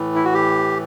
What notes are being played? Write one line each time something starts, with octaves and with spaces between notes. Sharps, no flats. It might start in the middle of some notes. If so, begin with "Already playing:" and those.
Already playing: A2 E3
E4
F#4
G4